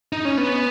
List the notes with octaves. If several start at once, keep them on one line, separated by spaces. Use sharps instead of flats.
D#4
C#4
B3